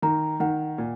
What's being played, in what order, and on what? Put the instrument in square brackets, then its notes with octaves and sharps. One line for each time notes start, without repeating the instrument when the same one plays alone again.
[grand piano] D#3 [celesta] A#5
[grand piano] D#3 [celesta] F#5
[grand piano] A#2